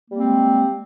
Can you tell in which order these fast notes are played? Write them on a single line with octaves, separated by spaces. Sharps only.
A#3 G3 C4 G#3